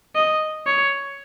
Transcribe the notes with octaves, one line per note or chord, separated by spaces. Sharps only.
D#5
C#5